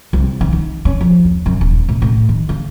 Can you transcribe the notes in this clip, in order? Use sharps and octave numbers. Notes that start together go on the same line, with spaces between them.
C2
D#3
D#4
C#4
F3
D#2
F#2
D#1
A2
A2
D#3
C#3